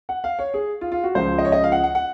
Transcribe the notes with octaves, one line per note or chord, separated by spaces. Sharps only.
F#5
F5
C#5
G#4
F4
F4
F#4
C#2 C#3 F3 C5
D#5
C#5
D#5
F5
F#5
F#5
F#5